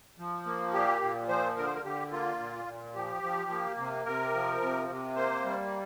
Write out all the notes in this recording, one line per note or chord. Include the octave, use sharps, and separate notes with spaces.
F3
A#3
A#2 G4
A#2
F3 C5
D3 A#4
C5
A#4
D3 G4
A#3 F4
A#2
A#2
F3 G4
F3
A#3
C3
C3 A#4
F3
C3
C3
A#3 C5
G3